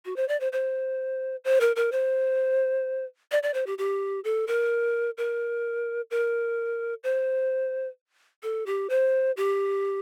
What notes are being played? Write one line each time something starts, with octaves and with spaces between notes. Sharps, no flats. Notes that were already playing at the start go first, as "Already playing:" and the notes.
F#4
C5
D5
C5
C5
C5
A#4
A#4
C5
D5
D5
C5
G4
G4
A4
A#4
A#4
A#4
C5
A4
G4
C5
G4